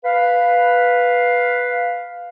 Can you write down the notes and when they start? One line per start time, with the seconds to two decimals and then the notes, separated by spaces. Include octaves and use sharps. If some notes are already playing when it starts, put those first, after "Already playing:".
0.04 B4 F5